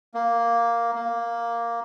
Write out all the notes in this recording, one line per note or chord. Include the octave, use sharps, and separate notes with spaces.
A#3
A#3